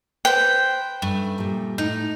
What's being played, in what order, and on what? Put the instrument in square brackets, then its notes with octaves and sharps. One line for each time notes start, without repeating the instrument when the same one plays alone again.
[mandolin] B4 C5 [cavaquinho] G5
[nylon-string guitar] G2 C#4 [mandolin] A3
[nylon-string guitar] A#2 G3
[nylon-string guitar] A2 [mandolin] D#4